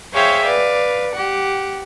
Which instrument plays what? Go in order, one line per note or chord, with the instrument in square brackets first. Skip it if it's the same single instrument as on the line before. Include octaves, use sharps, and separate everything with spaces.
[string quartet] G#4 C5 C#5 E5 F5 G5
B4 D5 F5
G4 F#5